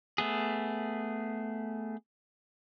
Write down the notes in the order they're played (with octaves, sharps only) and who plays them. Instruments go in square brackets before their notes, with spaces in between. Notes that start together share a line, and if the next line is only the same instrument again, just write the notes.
[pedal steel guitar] A3 B3 G#4